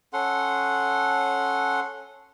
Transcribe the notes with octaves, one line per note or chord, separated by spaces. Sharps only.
C#4 A4 F#5 C6